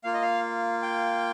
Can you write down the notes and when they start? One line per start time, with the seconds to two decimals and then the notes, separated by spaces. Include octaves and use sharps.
0.04 A#3 F4 F5
0.14 D#5
0.22 F5
0.83 G5